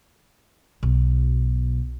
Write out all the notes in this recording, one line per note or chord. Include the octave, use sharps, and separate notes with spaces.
B1 B2